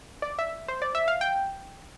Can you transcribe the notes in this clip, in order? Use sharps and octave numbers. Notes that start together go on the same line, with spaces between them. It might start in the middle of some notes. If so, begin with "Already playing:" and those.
D5
E5
C5
D5
E5
F5
G5